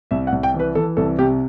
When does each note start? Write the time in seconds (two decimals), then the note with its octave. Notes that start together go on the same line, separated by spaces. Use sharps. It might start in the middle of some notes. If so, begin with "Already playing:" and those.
0.11 C2 E5
0.27 F#5
0.32 C2
0.43 G5
0.54 E3
0.59 B4
0.75 E3 A4
0.97 C2 A4
1.19 C3 G4